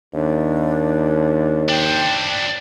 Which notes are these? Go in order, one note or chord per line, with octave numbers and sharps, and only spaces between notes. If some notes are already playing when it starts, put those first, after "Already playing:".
D#2 D4
D4 C5 G5